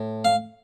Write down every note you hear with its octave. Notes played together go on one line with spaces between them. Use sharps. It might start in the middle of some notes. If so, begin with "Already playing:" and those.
Already playing: A2
F5